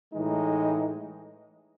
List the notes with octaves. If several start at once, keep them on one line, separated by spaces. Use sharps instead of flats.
A2 E3 G#3 D#4